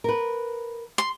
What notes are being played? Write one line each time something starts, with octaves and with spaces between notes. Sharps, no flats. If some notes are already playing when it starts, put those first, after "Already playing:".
A#4 B4
C6